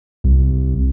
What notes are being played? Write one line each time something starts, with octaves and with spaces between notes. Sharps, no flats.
C2